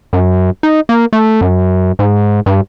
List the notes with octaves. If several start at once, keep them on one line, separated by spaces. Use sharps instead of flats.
F#2
D#4
A#3
A3
F#2
G#2
G2